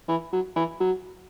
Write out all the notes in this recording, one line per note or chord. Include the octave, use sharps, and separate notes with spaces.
E3
F#3
E3
F#3